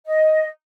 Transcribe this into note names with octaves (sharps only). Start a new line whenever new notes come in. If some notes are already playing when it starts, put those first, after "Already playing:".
D#5